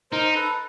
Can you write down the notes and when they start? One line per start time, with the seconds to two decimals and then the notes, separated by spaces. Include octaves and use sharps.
0.11 D#4 A#4 C5
0.35 A4 B4